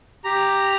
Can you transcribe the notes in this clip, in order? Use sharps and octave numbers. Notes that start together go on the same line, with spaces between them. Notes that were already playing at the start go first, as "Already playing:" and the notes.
G4 A#5